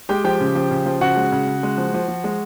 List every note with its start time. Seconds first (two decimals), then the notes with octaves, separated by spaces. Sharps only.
0.09 G#3 G4 G5
0.24 F3 G4 G5
0.40 C#3
0.55 F3
0.71 C#3
0.86 F3
1.01 C#3 F#4 F#5
1.17 G#3
1.32 C#3
1.47 C#3
1.63 G#3
1.78 F3
1.94 F3
2.08 F3
2.24 G#3